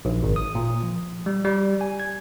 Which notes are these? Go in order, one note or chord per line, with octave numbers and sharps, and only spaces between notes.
A#1
G#1
D#6
A#2
F3
G3
G3
G#5
G#6